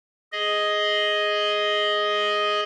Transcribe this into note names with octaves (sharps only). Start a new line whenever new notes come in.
G#4 D#5